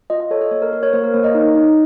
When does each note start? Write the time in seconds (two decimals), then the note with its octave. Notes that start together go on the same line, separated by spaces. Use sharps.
0.10 F4 D#5
0.20 D#5
0.31 A4 C#5
0.41 D#5
0.51 A#3 C#5
0.62 A#4
0.72 A#3 A#4
0.83 C#5
0.93 A#3 C5
1.04 A#4
1.14 A#3 C#5
1.24 D#5
1.35 D#4
1.55 D#4